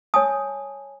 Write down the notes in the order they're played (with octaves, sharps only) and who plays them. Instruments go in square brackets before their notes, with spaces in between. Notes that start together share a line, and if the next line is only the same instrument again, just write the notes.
[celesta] C#5 G#5 A5 [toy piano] D#6